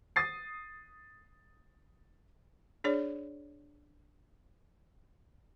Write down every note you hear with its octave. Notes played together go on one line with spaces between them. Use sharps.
D#6 A6 C7
D4 G#4 C#5 D5